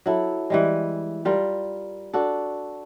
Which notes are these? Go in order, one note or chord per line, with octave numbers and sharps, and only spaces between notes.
F#3 E4 A4
E3 G3 G#3
G3 F4 A#4
D4 F#4 A4